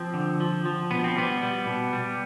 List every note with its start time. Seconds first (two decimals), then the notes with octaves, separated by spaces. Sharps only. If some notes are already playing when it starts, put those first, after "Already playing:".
Already playing: F3 C4
0.14 D3
0.40 F3
0.65 F3
0.91 B2 B3
1.04 C4
1.16 G3 B3
1.42 G3
1.67 B2
1.93 G3